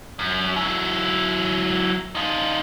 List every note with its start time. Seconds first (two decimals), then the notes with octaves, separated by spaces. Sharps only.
0.19 F#2
0.57 F#3 E4
2.15 D#4 F4